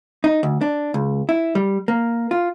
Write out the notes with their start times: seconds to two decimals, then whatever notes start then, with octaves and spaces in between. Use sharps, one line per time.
0.24 D#4
0.43 D2
0.61 D4
0.94 C#2
1.29 E4
1.55 G3
1.88 A#3
2.31 F4